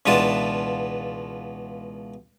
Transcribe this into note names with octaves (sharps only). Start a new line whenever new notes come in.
C#2 B2 E3 D4 F4 A5